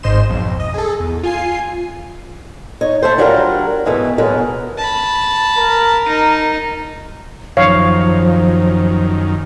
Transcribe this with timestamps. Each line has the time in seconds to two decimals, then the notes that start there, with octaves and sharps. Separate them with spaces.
0.03 G#1 G#2 C5 D#5 C6 E7
0.29 B1 F2
0.60 D#5
0.74 G#4 A4
1.00 E2
1.23 F4 G#5 C7
2.81 D#4 C#5
3.03 A3 A4 C5
3.18 F#3 G3 D4 F4 G4 A#4
3.85 G#2 B2 E3 A3
4.18 B2 F#3 G#3 A#4 B4
4.78 A5 B5
5.58 A#4
6.05 D#4
7.57 F#2 D#3 F3 C#5 F5